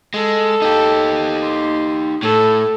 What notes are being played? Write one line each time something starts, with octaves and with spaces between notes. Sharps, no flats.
G#3 A4
D#4 G4
C6
A2 A4